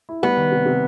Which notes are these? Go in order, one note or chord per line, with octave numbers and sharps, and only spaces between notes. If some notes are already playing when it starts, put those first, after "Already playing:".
E4
G3 B3
D#3
C3
C3